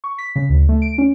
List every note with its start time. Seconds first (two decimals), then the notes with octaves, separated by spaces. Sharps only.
0.04 C#6
0.18 B6
0.36 C#3
0.49 D2
0.69 A3
0.82 D7
0.98 C#4